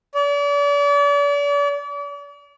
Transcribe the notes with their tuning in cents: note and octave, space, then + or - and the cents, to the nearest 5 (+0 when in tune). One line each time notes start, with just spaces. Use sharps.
D5 -40